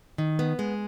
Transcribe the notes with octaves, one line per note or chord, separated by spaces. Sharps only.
D#3
B3
G#3